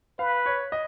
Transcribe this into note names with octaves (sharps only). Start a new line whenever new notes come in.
B4 F5
C#5
D#5